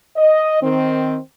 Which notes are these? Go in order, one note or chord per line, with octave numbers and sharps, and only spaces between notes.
D#5
D#3 C4